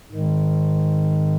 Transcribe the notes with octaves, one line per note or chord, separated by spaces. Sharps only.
G#2 D#3 G#3